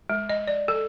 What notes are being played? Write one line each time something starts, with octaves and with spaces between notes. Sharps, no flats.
G#3
D#5
D5
A4